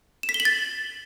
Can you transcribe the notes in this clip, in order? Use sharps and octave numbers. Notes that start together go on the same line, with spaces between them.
E7
B6
G7
F#7
A6